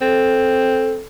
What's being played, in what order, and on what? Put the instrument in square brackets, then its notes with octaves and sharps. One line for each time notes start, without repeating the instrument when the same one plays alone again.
[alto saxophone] C4 [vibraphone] A4